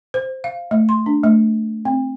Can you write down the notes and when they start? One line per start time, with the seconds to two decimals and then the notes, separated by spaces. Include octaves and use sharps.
0.14 C5
0.44 F5
0.71 A3
0.89 C6
1.06 D4
1.24 A3
1.85 C4